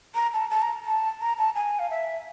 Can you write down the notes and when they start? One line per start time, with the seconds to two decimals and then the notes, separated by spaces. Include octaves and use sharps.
0.15 A#5
0.34 A5
0.51 A5
0.62 A#5
0.86 A5
1.21 A#5
1.38 A5
1.55 G#5
1.79 F5
1.90 E5